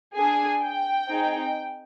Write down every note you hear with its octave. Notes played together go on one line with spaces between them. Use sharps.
D4 G#4 G#5
G5
C4 D#4 G#4